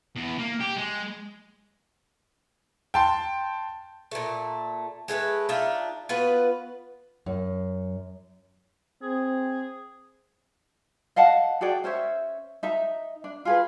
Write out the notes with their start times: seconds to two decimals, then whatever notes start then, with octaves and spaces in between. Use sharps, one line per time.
0.16 E2
0.39 A#3
0.60 G4
0.76 G#3
2.94 G5 A5 C6
4.11 A#2 A3
5.08 G#3 A3 A4 B4
5.49 D4 D#4 F4 E5
6.09 B3 F4 F#4 B4
7.26 F#2
9.02 C4 G#4
11.16 D#5 F5 F#5 A5
11.61 F#4 G#4 D5 G5
11.84 C#4 C5 C#5 E5
12.63 D#4 E5 A#5
13.24 D4
13.45 F4 G#4 B4